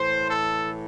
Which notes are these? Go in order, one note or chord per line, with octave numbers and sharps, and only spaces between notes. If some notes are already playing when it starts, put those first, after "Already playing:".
Already playing: A2 E3 C5
A4